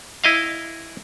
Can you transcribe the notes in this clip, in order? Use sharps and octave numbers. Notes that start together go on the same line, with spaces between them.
E4 D#5 F5